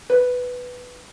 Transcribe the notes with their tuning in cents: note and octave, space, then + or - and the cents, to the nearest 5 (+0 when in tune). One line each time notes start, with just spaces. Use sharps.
B4 +5